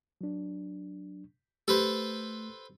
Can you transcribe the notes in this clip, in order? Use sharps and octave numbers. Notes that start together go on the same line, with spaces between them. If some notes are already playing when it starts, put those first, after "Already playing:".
F#3 D4
A3 G4 A4 B4 C5